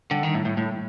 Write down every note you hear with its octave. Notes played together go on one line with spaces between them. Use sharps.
D3 G3
D#3
A2
A2
A2